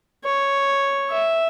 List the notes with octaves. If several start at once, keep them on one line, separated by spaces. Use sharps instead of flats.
C#5
E5